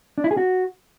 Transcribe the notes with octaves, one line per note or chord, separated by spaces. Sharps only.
D4
E4
G#4
F#4